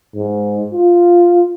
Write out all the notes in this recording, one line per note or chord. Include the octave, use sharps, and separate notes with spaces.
G#2
F4